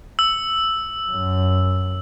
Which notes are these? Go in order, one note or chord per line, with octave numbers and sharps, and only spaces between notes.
E6
F#2